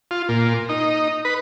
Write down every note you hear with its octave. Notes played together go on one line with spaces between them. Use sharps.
F4
A#2
D#4
B4